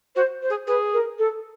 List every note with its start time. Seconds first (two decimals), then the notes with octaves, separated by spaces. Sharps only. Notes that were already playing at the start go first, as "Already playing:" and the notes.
0.16 F#4 C5
0.42 C5
0.50 G#4
0.67 G#4 B4
0.93 A#4
1.18 A4